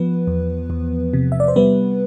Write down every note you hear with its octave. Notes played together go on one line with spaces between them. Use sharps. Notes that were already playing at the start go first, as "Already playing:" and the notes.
Already playing: F3 B3 B4
E2
E2
C3
E5
D5
C5
G3 B3 B4